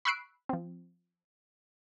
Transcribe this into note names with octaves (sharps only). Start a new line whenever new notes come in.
B5 C#6 E6 F#6 C7 D7
F3 C4